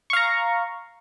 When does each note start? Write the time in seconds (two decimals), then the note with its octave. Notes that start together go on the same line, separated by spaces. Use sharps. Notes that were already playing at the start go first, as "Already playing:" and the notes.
0.10 C#6
0.13 F5
0.17 A#5